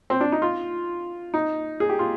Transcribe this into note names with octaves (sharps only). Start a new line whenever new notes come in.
C4
D4
D#4
F4
D#4
G#4
G4
F4